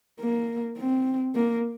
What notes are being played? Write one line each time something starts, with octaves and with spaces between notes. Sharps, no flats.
A#3
C4
A#3